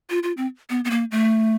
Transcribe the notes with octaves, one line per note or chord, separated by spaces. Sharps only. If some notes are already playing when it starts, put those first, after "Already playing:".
F4
F4
C4
B3
B3
A#3
A3